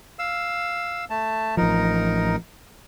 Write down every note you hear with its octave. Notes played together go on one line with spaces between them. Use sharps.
F5 E6
A3 A5
A1 F3 D#4 A#4